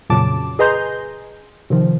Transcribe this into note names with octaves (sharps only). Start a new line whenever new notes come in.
F2 A#2 C#3 F#3 A5 D6
G#4 B4 D#5 A#5 C6 G6
C3 D#3 F3